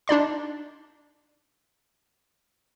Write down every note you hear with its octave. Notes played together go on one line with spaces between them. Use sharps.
D4 D#4 D5 C6